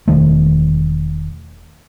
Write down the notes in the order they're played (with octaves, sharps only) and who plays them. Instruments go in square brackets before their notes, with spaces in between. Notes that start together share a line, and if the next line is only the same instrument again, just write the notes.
[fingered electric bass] E1 C#2 D#3 A3